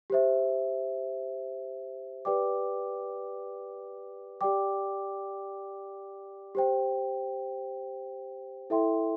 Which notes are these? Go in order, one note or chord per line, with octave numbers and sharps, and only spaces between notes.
G4 C5 E5
G4 B4 D5 G5 D6
G4 D5 G5 D6
G4 C5 G5
E4 A4 E5 G5 C6